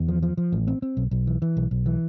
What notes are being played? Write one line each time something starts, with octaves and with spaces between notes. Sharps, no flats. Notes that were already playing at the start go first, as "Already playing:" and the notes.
Already playing: E2
F3
F3
F3
A1
C4
C4
B1
B1
E3
E3
B1
B1
E3